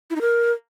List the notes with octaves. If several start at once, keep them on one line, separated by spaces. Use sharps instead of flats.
E4
D#4
A#4